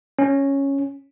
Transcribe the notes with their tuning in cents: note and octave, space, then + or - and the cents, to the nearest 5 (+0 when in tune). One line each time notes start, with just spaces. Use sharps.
C#4 -5